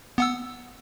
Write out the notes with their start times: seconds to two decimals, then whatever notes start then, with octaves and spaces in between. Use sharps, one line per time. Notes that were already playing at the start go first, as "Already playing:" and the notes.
0.18 B3 F#5 E6